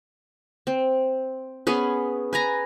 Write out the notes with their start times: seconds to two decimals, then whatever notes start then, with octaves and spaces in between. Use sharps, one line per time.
0.67 C4
1.67 B3 C#4 G#4 B4
2.33 B4 G#5 A#5